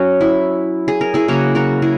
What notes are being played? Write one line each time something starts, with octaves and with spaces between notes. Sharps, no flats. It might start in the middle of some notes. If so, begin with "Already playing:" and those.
Already playing: F#3 C#4 F#4
E4
G#4
A#4
E4 G#4
C#3 F#3 A#3 F#4 A#4
F#4 A#4
E4 G#4